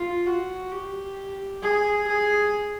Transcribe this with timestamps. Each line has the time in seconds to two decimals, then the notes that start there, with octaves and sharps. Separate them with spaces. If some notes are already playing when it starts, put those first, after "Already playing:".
Already playing: F4
0.26 F#4
0.72 G4
1.62 G#4
2.08 G#4